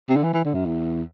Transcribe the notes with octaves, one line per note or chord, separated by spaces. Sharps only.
C3
D3
E3
E3
D3
F#2
E2